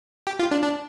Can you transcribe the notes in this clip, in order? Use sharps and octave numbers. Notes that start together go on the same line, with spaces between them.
G4
F4
D4
D4